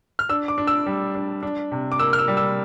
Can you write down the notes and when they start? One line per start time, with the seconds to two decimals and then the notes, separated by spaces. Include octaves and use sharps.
0.19 F6
0.29 D4 E6
0.48 D6
0.58 D4
0.67 E6
0.86 G3
1.15 D4
1.43 D4
1.71 C3
1.92 D6
1.99 A#3 E6
2.13 F6
2.19 E6
2.28 G3
2.37 E6